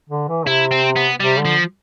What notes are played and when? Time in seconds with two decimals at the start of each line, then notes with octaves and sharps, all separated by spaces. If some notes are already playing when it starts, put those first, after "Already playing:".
0.10 D3
0.29 E3
0.47 C3 E4
0.71 C4
0.96 B3
1.20 C3 G3
1.39 D3
1.45 F3